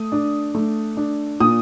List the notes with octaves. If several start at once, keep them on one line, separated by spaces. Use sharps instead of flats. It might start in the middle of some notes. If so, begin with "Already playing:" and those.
Already playing: A3 D#6
D4
A3
D4
A#2 D#6